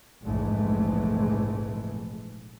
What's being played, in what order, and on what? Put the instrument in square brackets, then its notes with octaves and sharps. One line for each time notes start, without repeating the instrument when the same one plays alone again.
[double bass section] F1 A#1 G#2 E3 G#3 A3